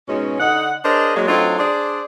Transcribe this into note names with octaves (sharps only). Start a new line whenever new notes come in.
G#2 B2 G#3 C#4
D3 D#4 F#5
D4 G#4 A#4 C5 C#5 D#5
F#3 G#3 A#3
F#3 A3 C4 D4 D#4 F4
D4 G#4 C5 D5